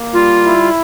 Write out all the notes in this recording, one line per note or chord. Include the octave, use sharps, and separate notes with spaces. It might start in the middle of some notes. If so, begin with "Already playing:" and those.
Already playing: A#3
G3 F4
E4